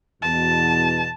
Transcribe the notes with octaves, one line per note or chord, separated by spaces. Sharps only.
E2 B2 A5